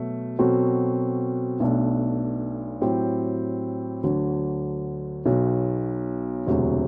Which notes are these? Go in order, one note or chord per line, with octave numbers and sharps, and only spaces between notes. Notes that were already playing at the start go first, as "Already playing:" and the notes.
Already playing: B2 F#3 A3
B2 F#3 C4 F#4 A4
B1 B2 A3 D4
A2 F#3 C4 G4
D2 D3 F#3
B1 B2 F#3
E1 D2 C3 F#3